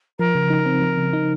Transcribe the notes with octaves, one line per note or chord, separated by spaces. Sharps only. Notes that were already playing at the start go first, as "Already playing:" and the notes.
F3 A#4
C#3
D#4
C4
F3
C#3
D#4